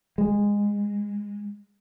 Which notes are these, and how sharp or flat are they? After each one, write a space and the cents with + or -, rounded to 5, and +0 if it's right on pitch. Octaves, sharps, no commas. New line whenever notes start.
G#3 -20